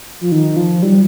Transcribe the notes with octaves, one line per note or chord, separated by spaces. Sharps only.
F3
D#3
F3
G3